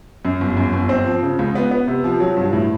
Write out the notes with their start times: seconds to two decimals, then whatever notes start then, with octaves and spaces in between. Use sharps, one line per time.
0.25 F#2
0.41 G1
0.57 F#2
0.73 G1
0.89 C4
1.06 F3
1.22 C#3
1.39 C#2
1.55 B3
1.71 B3
1.87 C3
2.04 F3
2.20 F#3
2.36 G2
2.53 A2